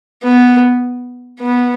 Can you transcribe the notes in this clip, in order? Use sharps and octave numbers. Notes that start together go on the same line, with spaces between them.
B3
B3